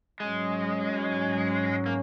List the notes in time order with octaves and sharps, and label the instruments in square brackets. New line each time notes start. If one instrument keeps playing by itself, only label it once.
[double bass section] G#2 F#3 C#4 [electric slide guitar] G#3
[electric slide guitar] A#3